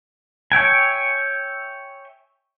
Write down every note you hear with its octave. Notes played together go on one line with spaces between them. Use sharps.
C#5 E5 G5 G#5